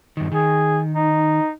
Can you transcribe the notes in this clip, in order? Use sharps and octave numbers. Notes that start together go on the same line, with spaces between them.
G2 D#3
D#3 G#4
D#4